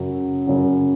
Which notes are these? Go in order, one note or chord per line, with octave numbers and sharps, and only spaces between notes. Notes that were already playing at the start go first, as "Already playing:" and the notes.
Already playing: F#2 C#3 F#3
F#2 C#3 F#3